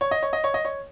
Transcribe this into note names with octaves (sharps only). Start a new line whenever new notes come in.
C#5
D#5
C#5
D#5
C#5
D#5
C#5